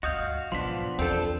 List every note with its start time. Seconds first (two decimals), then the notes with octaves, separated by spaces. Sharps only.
0.03 D2 G2 F#4 D#5 F5 D#6 G6
0.52 B1 G#2 F3 B3 D4 C6 B6
0.99 E2 C4 A4 D5 A5